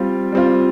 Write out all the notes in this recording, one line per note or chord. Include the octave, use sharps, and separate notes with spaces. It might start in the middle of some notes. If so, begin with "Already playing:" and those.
Already playing: G3 C4 F4
G3 C4 F4